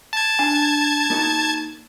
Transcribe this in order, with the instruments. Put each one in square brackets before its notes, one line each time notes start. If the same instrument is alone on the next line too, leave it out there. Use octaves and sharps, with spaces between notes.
[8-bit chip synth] A5 G#6
[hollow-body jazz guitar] D4 G#5
A#3 D#4 F#4